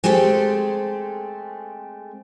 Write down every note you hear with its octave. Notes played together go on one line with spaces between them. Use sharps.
G#3 A3 C4 G4 A4